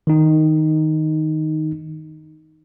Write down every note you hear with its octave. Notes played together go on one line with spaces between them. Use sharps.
D#3 D#4